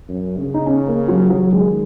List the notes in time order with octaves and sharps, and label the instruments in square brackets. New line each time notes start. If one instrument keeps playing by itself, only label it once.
[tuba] F#2
C#3
[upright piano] D#4
C#4
A#3
F#3
F#3
[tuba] D#3 [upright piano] G#3